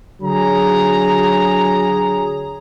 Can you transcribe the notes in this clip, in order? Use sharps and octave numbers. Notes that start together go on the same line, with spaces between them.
D3 F#3 G#4 A#5